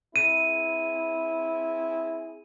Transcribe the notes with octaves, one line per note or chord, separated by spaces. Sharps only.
C4 E4 G#4 D#7